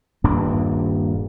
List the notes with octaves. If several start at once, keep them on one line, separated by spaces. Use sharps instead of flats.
D#1 G2 A#3 D4